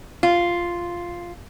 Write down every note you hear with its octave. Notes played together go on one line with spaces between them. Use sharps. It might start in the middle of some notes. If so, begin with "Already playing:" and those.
F4